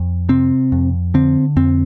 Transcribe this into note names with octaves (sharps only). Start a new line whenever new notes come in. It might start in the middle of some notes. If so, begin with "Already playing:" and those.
Already playing: F2
C3 C4
F2
D3 C4
F2 C4